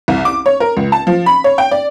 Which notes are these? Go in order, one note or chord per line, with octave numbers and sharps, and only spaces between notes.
C2
D6
C#5
A#4
C#2
A5
F3
B5
C#5
G5
D5